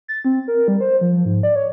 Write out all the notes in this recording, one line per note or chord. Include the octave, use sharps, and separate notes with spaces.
A6
C4
A#4
G3
C5
F3
G#2
D5
C#5